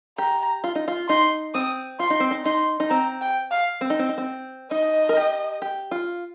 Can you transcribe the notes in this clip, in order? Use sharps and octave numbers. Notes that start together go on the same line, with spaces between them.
G4 A#5
F4
D#4
F4
D#4 C6
C4 D#6
F4 C6
D#4
C4
D#4
D#4 C6
D#4
C4 A#5
G5
F5
C4
D#4
C4
D#4
C4
D#4 D#5
A#4
G4
G4
F4